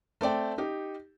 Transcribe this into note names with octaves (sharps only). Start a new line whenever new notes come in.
A3 C4 D5 G5
D#4 G4